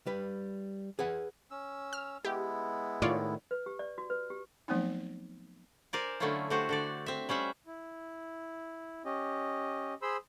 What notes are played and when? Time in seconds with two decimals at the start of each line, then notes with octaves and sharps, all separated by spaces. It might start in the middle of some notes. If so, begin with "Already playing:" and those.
0.06 G3 B4
0.99 G#4 B4 F#5
1.51 C#4 E6
1.93 F6
2.25 G#3 B3 E4 G4
3.02 A2 D#3 F4 C#5 D5
3.51 B4
3.66 G4
3.79 D5
3.98 F#4
4.10 B4
4.30 G4
4.68 F3 F#3 A3 B3 C4 D#4
5.93 A#4 C5 D5 G#5
6.20 D3 F#3 A3 C#4 E4 F4
6.50 A3 D4 F#4 G4 C5
6.69 D3 A4 D5
7.06 C4 E5
7.29 G3 C#4 C5 E5 F#5
7.67 E4
9.05 C#4 G4 D#5
10.02 G#4 C5 B5 C6 E6